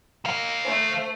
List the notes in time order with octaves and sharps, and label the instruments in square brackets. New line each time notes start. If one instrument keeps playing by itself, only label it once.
[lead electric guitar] D#3 F5
[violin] A3 C5